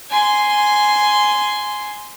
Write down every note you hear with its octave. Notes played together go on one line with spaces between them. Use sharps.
G#5 C6